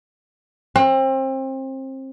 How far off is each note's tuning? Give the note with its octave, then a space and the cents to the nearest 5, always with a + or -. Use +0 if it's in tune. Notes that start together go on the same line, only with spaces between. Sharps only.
C4 +30